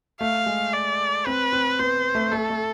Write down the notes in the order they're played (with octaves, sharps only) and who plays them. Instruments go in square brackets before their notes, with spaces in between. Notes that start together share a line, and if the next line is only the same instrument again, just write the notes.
[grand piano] A3 [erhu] F5
[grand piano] G#3
[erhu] D5
[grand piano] C4 [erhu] B4
[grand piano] C4
[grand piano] B3 [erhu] C5
[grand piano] A3
[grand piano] A3 [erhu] A4
[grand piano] A3